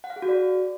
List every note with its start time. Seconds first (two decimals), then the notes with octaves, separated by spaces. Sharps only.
0.04 F#5
0.10 F5
0.16 G#4
0.22 F#4
0.29 D5